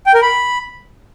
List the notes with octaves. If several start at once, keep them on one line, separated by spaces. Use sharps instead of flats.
G5
A#4
B5